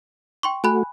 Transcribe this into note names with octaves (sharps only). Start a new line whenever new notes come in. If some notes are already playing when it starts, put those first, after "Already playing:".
G5 C6 C#6
A3 F#4 G#5 B5 F#6